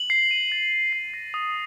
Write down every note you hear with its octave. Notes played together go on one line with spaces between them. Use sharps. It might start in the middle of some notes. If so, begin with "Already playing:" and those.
Already playing: F#7
C7
D#7
A6
F#7
C7
A#6
D#6